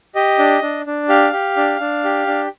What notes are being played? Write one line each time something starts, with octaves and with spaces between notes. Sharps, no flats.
G4 D#5
D4
D4
D4
G4 F5
G4
D4
D4
G4
D4